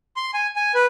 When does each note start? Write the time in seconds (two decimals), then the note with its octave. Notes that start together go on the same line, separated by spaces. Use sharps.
0.16 C6
0.34 G#5
0.56 G#5
0.74 B4